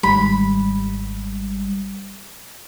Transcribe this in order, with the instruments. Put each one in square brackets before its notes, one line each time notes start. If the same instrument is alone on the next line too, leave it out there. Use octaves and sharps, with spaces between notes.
[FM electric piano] G#1 G#2 G3 [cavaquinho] B5